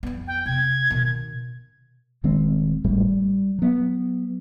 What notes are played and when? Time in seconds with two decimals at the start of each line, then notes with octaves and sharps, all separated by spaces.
0.03 F2 B3
0.27 G5
0.46 C3 G#6
0.90 B2 D#3
2.24 D#1 D#3 G#3 C4
2.84 G#1 A2 G3 A3
3.10 G3
3.59 F#3 B3